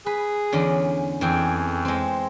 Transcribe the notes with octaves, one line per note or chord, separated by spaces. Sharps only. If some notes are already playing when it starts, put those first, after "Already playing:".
G#4 B4
E2 D3 C#4
F2 E3 G#4 G5
G#3 C4